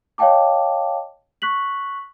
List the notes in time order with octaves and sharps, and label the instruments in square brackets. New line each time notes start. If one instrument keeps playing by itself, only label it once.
[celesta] C#5 D#5 F5 G5 A5 D6
C#6 F#6 B6 F#7